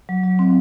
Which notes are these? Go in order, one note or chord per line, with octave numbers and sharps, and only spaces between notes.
F#3
F#3
C4